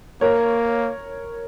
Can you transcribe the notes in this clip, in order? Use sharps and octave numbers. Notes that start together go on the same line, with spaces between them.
A#3 A#4 C#5